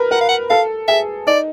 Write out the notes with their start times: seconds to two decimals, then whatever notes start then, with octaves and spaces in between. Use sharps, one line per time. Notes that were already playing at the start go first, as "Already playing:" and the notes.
Already playing: A#4 B4
0.11 A#4 F#5
0.21 F5
0.29 F#5
0.50 A4 F5
0.88 G#4 E5
1.27 D#4 D5